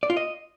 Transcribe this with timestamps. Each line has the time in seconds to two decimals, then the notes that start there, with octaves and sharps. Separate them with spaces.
0.03 D5
0.10 F4
0.17 D#5